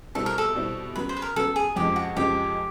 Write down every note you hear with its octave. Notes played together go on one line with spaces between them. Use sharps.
B2 G3 C4 E4 A4
A#4
A4
B2 G3 C4 E4
C#3 F#3 B3 B4
C5
B4
A#4
C#3 F#3 B3 A4
G#4
F2 C#3 F3 G#3 C4 G4
F#4
F2 C#3 F3 G#3 C4 G4